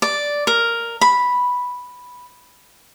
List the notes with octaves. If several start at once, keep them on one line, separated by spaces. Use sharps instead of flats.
D5
A#4
B5